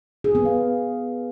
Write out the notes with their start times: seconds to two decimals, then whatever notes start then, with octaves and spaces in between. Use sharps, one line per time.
0.24 G#4
0.35 B3
0.45 F5